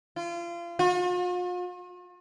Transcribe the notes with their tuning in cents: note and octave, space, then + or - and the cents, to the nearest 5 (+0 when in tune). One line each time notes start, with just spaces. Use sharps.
F4 -30
F4 +45